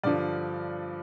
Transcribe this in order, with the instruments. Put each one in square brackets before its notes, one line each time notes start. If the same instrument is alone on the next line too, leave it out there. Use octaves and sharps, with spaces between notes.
[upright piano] G2 D3 F3 D5